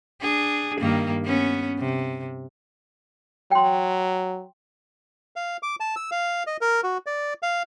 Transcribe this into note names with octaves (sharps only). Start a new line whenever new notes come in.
D4 G#4
G2 D#3 A#3
B3 C#4
C3
F#3 G5 C6
F5
D6
A5
E6
F5
D#5
A#4
F#4
D5
F5